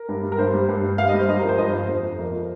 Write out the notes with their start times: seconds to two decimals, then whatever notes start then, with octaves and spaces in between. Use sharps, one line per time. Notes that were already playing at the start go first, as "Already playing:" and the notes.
Already playing: A#4
0.09 G2
0.23 G3
0.32 A#4
0.38 G2 C5
0.54 G3
0.69 G2
0.83 G3
0.98 G2 F5
1.09 G3 D#5
1.19 C5
1.28 G2 D#5
1.39 F3 A#4
1.49 C5
1.58 G2 D#5
1.73 F3 C5
1.88 F2
2.03 F3
2.18 F2 A#4
2.33 F3